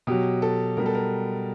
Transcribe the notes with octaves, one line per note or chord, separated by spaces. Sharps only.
B2 F#3 G4
A4
B2 G3 A#4
A4
A#4